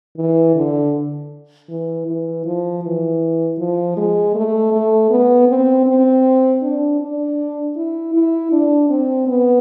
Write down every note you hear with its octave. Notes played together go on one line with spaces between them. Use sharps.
E3
D3
E3
E3
F3
E3
F3
G#3
A3
A3
B3
C4
C4
D4
D4
E4
E4
D4
C4
B3